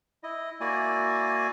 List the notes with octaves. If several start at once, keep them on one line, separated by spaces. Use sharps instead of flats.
E4 D#5
A#3 E4 F#4 D5 G#5